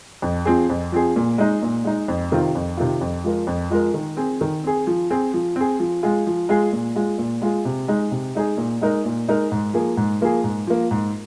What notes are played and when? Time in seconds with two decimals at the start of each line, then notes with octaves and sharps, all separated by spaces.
0.22 F2
0.45 F3 C4 G#4
0.70 F2
0.92 F3 C4 G#4
1.16 A#2
1.38 G#3 D#4
1.62 A#2
1.84 G#3 D#4
2.08 F2
2.31 C3 D#3 C4 F4
2.55 F2
2.77 C3 D#3 C4 F4
3.01 F2
3.24 F3 G#3 F4 A#4
3.47 F2
3.70 F3 G#3 F4 A#4
3.94 D#3
4.17 C4 G#4
4.41 D#3
4.64 C4 G#4
4.87 F3
5.10 C4 G#4
5.34 F3
5.56 C4 G#4
5.80 F3
6.03 G#3 F4 G#4
6.27 F3
6.49 G#3 F4 G#4
6.72 A#2
6.96 G#3 F4 G#4
7.18 A#2
7.42 G#3 F4 G#4
7.65 C3
7.88 G#3 D#4 G#4
8.11 C3
8.35 G#3 D#4 G#4
8.58 A#2
8.81 G#3 D#4 A#4
9.05 A#2
9.28 G#3 D#4 A#4
9.52 G#2
9.74 F3 A#3 G#4
9.97 G#2
10.21 F3 A#3 G#4
10.44 G#2
10.67 F3 A#3
10.91 G#2